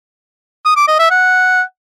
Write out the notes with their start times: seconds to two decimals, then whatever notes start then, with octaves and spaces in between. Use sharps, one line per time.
0.65 D#6
0.77 D6
0.88 D#5
0.99 E5
1.10 F#5